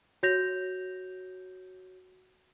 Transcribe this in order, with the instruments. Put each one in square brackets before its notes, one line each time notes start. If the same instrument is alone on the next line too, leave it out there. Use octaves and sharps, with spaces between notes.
[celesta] F#4 C#5 G6 A#6 F7